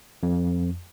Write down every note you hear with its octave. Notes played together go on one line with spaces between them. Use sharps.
F2